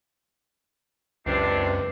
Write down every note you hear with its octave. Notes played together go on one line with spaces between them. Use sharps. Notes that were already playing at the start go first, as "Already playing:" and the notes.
C#2 F#2 C3 D4 B4 C7